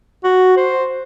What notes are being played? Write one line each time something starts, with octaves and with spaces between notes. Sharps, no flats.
F#4
C5